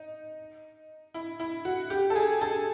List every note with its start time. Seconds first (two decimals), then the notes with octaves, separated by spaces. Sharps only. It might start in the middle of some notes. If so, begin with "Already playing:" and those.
Already playing: D#4
1.14 E4
1.40 E4
1.65 F#4
1.90 G4
2.10 A4
2.15 G#4
2.41 A4